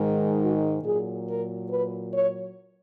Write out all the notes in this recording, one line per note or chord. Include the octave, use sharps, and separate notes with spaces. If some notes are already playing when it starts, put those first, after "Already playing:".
Already playing: G#2 D#3 G#3
F#4
A#2 F#3 G#4
A#4
B4
C#5